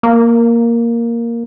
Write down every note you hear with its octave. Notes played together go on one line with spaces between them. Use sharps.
A#3